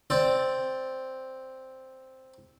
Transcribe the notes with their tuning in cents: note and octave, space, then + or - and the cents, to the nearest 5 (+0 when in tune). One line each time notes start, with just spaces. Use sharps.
C4 +0 D5 +0